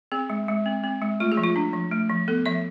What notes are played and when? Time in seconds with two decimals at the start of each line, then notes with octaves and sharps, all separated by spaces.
0.12 C4 G#4
0.30 G#3
0.48 G#3
0.66 C4
0.84 C4
1.02 G#3
1.20 A3 F4
1.32 G#4
1.37 F3
1.43 F4
1.56 D4
1.73 F3
1.91 A3
2.10 F3
2.28 B3 A4
2.46 F3 E5